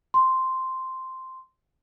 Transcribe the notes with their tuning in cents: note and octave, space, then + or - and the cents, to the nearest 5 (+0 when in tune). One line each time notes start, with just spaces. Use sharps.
C6 -5